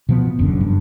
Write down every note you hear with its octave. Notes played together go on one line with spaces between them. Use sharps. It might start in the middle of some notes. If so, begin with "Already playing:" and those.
B2 F3 B3
F#1 F#2 D3
G2